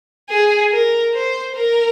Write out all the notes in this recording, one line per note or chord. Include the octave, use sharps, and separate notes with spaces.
G#4
A#4
C5
A#4